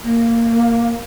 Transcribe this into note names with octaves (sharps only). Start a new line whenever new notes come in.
A#3